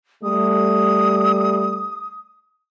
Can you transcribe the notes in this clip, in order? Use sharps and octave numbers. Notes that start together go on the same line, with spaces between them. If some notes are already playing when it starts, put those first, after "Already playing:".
G3 A3 D#6